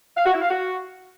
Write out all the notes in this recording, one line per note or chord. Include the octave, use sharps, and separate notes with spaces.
F5
F#4
E4
F5
F#4